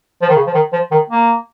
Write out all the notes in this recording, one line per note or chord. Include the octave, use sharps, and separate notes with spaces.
F3
D#3
C#3
F3
D#3
F3
D#3
A#3